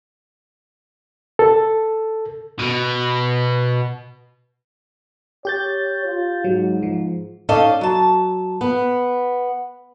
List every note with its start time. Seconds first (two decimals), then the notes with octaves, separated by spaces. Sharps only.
1.39 A4
2.59 B2
5.45 G4 C#5 G6 A6
6.05 F4
6.44 G#2 F#3
6.83 F3
7.49 C#4 D#4 A4 D5 D#5 F5
7.81 F#3 A5
8.61 B3